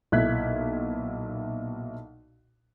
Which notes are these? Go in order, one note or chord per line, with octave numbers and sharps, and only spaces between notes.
B1 A#2 E4 F#6 G#6 B6